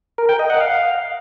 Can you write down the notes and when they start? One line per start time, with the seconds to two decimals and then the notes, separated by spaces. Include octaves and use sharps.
0.18 A#4
0.29 G5
0.39 D#5
0.50 F#5
0.60 F5